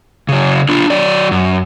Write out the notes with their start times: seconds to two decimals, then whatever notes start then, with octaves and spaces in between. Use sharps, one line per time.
0.29 C#3 F#3
0.69 D4 F4
0.90 F#3 D5
1.31 F#2